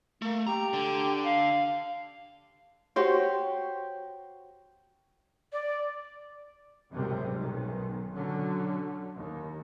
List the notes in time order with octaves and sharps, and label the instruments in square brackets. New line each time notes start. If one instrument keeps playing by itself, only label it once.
[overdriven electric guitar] A3 [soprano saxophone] A#3
[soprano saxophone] G4 [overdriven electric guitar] A#5
[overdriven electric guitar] D3
[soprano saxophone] F5
[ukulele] F#4 G4 C5 C#5
[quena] D5
[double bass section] G#1 C#2 F#2 C3 G3
B1 D#3
D3 F#3 C#4
D#2